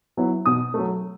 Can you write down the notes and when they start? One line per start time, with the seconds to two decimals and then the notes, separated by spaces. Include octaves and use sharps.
0.17 F#3 B3 E4
0.46 B2 D#6
0.74 F#3 A3